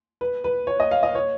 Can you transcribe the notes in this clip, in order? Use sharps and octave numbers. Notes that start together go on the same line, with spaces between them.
B4
B4
C#5
D#5
F5
D#5
C#5